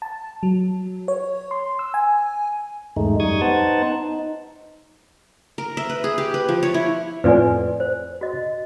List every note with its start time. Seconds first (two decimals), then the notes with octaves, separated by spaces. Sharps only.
0.02 A5
0.43 F#3
1.08 C#5
1.51 C6
1.79 E6
1.94 G#5
2.97 E2 G#2 G#3 A3 D#4
3.20 F#2 G3 D#4 C#6 D#6 G#6
3.41 B3 D#4 C5 F#5 A5
3.92 D#4
5.58 A#4
5.77 E5
5.90 B4
6.04 G#4
6.18 G4
6.34 B4
6.49 F3
6.63 C#5
6.74 E4
7.24 F2 A2 F4 B4 D5 G#5
7.80 C5
8.21 F#4 D#5